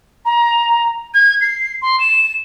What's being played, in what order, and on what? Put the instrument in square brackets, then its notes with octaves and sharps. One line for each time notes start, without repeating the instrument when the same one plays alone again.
[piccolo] A#5
G#6
C7
C6
E7